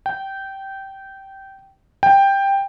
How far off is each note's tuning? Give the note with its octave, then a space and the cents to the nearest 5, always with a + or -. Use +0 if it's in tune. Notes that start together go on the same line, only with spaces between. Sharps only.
G5 -15
G5 +10